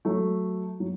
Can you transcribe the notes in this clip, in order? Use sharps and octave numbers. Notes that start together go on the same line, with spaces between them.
F#3 A3
F#3